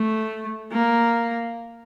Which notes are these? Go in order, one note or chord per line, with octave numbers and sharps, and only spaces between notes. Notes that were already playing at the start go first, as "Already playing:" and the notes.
Already playing: A3
A#3